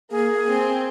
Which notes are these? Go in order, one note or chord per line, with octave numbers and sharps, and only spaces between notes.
A#3 G#4
C4